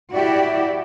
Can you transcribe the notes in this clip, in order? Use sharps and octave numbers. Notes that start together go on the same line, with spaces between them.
E4 F#4 G4 D5 E5